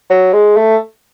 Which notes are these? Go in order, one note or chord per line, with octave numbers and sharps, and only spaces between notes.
F#3
G#3
A3